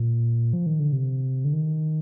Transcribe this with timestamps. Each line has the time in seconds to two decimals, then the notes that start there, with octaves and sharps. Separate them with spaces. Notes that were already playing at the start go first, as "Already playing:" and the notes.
Already playing: A#2
0.53 F3
0.66 D#3
0.80 D3
0.93 C3
1.45 D3
1.53 D#3